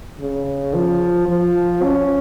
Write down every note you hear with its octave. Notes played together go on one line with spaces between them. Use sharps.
C#3
F3
F3
C#4